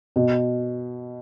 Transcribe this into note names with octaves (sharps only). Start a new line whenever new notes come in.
B2